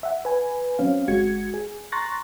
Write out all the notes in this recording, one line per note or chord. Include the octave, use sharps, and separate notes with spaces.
E5 F#5
B4 G#5
F#3 C4 C#4 F5
G1 G#3 F#4 G#6 C#7
G#4
A#5 C6 C#6 F#6 A6 A#6